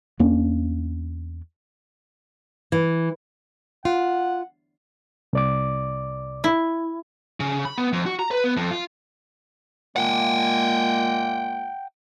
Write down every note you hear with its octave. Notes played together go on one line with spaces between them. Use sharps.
E2 A#3 C#4 D4
E3
F4 F#5
C2 D5 D6
E4
C#3
B5
B3
F2
F#4
A#5
B4
B3
F2
F4
A#2 G#3 A#3 F#5 G5